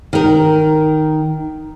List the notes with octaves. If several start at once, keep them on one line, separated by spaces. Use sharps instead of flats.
D#3 A#4